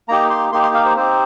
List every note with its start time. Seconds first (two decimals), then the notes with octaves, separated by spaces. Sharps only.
0.09 A#3 D#4 G4 A#5
0.30 C6
0.52 A#3 D#4 G4 C6
0.63 C6
0.74 F5
0.86 C5
0.96 C4 D#4 G4 C5